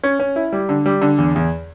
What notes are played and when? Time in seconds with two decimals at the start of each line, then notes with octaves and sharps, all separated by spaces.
0.03 C#4
0.20 C#4
0.36 E4
0.52 G3
0.69 D3
0.86 G3
1.01 D3
1.18 E2
1.36 E2